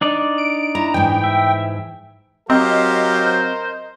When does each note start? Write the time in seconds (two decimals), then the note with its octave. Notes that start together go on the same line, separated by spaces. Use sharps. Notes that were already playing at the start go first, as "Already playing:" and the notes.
0.01 D4 D#4 D5
0.38 D7
0.75 E4 A#5
0.94 G#2 E3 G5
1.24 E5
2.50 F#3 C4 G4 A#4 C5 D#5 F5 A#5